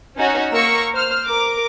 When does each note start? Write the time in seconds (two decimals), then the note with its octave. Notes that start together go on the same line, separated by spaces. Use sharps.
0.17 C#4 D#4 F#4 C#5
0.51 A#3 A#4 C#6 E6 A#6 C#7
0.94 C5 F6
1.27 A#4 D6